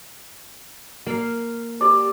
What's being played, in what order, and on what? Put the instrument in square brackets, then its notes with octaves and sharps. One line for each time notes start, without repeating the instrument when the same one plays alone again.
[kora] A#3 F5
[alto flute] G4 [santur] D5 E6